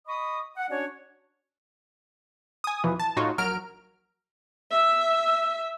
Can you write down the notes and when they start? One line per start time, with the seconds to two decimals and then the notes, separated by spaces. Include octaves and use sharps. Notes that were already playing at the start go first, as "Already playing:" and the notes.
0.07 D#5 B5 C#6 D#6
0.56 F#5
0.70 C#4 D4 F#4 C#5 D5
2.64 G#5 D#6
2.84 E2 B2 E3 F3
3.00 A5
3.16 A2 D#4 F4 F#4 C#5
3.38 A#1 F#3 A#4 F6 D7
4.72 E5